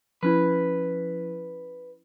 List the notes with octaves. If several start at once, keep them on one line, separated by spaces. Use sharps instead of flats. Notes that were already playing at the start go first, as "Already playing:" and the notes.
F3 C#4 E4 B4